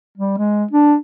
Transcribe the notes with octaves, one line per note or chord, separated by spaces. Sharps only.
G3
G#3
D4